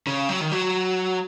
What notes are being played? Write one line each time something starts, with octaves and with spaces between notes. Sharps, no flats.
C#3
F#3
D#3
F#3